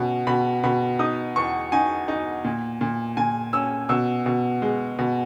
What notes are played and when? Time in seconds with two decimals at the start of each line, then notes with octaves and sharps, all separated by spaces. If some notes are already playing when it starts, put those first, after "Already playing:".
Already playing: B2 C#4
0.27 B2 B5
0.64 B2 B5
0.99 D#4 D#6
1.36 E2 C#6
1.72 D#4 G#5
2.08 D#4
2.44 A#2
2.81 A#2
3.17 A#2 G#5
3.53 C#4 E6
3.89 B2 E6
4.26 B2
4.62 G#3
4.99 B2